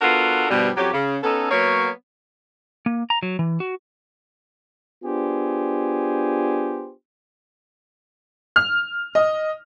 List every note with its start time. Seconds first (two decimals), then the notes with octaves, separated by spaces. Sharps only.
0.02 B3 D4 F4 F#4 A4 A#4
0.50 G2 B2 F3 G3
0.77 F2 F#3 C#4 G4
0.93 C#3
1.23 B3 C#4 D#4 A4
1.51 F#3 A#3 B3 C#5
2.86 A#3
3.10 A#5
3.23 F#3
3.39 E3
3.60 F#4
5.04 B3 D4 F4 G4 G#4 C5
8.56 F6
9.15 D#5